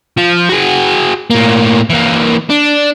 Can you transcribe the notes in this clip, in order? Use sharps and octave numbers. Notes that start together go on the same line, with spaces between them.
F3
F#4 G#4
A2 A#3
E3 A#3
D4